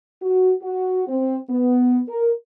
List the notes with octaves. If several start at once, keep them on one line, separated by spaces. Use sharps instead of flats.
F#4
F#4
C4
B3
A#4